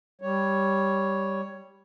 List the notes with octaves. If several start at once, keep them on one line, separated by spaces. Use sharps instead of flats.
G3 C#5